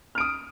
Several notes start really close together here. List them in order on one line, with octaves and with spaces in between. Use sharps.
F6 D7 D#6